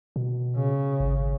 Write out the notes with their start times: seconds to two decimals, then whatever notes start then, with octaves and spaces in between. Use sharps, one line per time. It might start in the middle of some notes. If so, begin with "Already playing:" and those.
0.16 B2
0.56 C#3
1.00 G#1